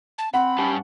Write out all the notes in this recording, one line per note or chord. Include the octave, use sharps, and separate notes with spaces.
A5
C4 F#5 B5
G2 C#4 G4 A5